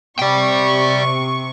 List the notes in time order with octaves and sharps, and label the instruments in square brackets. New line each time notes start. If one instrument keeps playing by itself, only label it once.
[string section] C3 C#6 [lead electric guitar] D5 G5